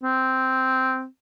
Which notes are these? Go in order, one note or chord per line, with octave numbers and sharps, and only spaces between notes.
C4